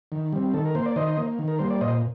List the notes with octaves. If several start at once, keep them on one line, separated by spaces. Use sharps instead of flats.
D#3
G3 C4
D#3 A4
A#4
A#3 C5
D5
D#3 C5 D#5
A#3
D#3
A#4
G3 A#3 C5
D5
A#2 C5 D#5